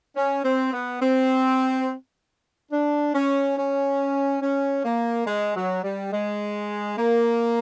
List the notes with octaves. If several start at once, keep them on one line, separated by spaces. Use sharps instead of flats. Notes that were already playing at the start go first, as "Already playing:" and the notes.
C#4
C4
B3
C4
D4
C#4
C#4
C#4
A#3
G#3
F#3
G3
G#3
A#3